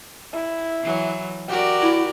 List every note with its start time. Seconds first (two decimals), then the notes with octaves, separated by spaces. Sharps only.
0.33 E4
0.82 E3 F#3
1.48 F#4 G4 A#4 D5
1.82 E4